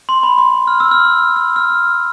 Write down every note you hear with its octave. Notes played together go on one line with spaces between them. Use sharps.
C6
B5
C6
F6
E6
F6
F6
F6